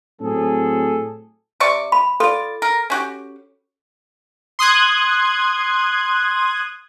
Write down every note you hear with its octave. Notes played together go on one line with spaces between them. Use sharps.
A2 F#3 C4 G#4 A4
C3 D5 C#6
B5
F4 A4 D5
A#4
C#4 F#4 G4
C6 D#6 F#6 G#6